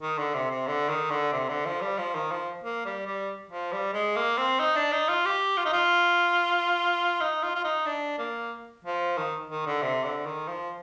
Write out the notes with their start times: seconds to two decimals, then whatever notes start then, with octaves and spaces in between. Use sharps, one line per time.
0.02 D#3
0.18 D3
0.34 C3
0.51 C3
0.67 D3
0.89 D#3
1.11 D3
1.33 C3
1.49 D3
1.66 F3
1.81 G3
1.98 F3
2.15 D#3
2.31 F3
2.64 A#3
2.85 G3
3.07 G3
3.50 F3
3.72 G3
3.93 G#3
4.16 A#3
4.37 C4
4.59 D#4
4.76 D4
4.92 D#4
5.08 F4
5.25 G4
5.57 F4
5.65 D#4
5.73 F4
7.21 D#4
7.43 F4
7.55 F4
7.64 D#4
7.86 D4
8.19 A#3
8.84 F3
9.17 D#3
9.50 D#3
9.66 D3
9.82 C3
10.04 D3
10.26 D#3
10.48 F3